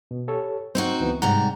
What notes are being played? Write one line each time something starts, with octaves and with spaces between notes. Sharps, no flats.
B2
G4 A4 C#5
C4 D#4 F#4 C5
C#2 E3 B3
G#2 C3 G3 F#5 A#5